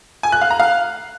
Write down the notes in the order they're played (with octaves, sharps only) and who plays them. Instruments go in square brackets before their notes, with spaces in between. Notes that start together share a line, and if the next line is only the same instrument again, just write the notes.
[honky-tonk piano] G#5
F#6
F5
A#5
F5